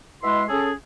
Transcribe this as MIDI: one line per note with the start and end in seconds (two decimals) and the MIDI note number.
0.23 0.42 47
0.23 0.42 56
0.23 0.42 64
0.23 0.42 76
0.23 0.42 84
0.49 0.70 61
0.49 0.70 68
0.49 0.70 69